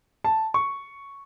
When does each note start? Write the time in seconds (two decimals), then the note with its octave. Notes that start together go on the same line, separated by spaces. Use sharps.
0.24 A5
0.54 C#6